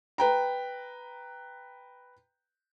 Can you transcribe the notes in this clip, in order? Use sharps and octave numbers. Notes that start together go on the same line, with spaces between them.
B4 G5 A#5